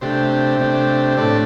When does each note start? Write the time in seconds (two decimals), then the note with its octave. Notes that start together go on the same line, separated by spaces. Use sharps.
0.01 C3 A3 D4 G4 C5
0.59 C3 A3 D4
1.11 C5
1.17 A2 A3 D4 A4 D5